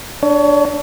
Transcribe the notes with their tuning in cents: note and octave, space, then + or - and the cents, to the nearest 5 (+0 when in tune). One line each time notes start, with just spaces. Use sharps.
D4 +0 C#5 +30